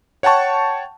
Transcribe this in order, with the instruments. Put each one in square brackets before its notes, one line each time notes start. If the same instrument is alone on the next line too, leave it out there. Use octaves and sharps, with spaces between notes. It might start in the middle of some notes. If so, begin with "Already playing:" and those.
[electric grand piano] C#5 F#5 G5 A5 C#6